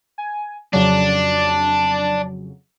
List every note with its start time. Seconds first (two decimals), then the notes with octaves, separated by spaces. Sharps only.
0.18 G#5
0.73 F2 C#3 F#3 D4